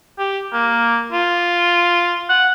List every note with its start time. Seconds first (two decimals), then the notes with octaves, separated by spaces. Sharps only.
0.19 G4
0.53 A#3
1.12 F4
2.29 F#5